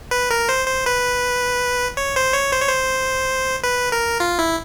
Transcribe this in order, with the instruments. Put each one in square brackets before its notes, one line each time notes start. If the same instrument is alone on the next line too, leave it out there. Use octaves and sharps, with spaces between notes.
[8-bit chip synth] B4
A#4
C5
C5
B4
C#5
C5
C#5
C5
C#5
C5
B4
A#4
F4
E4